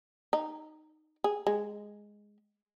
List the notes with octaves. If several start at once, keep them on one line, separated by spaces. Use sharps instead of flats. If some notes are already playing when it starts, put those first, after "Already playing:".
D#4
G#4
G#3